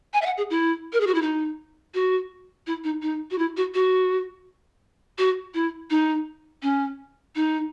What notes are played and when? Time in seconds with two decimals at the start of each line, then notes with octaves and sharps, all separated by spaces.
0.13 G#5
0.22 E5
0.26 F#5
0.37 G#4
0.50 E4
0.93 A#4
1.01 G#4
1.07 F#4
1.14 E4
1.22 D#4
1.94 F#4
2.67 E4
2.84 D#4
3.02 D#4
3.31 F#4
3.38 E4
3.57 F#4
3.74 F#4
5.18 F#4
5.54 E4
5.90 D#4
6.62 C#4
7.36 D#4